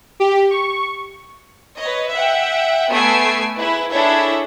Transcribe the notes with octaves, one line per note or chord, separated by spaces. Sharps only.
G4
C#6
B4 C#5 D#5
E5 F#5 G5
A3 B3 G#5 E6 C7 D7
E4 G#4 B4 E5
D4 E4 G#4 A4 C#5 E5